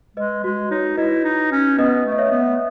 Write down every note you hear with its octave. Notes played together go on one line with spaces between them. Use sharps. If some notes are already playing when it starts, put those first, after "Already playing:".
G#3 B4 D#5
G#3 F#4
D#4 C#5
E4 B4 D#5
D#4
C#4
B3 B4 D#5
A3
D#5
C#5 E5
B3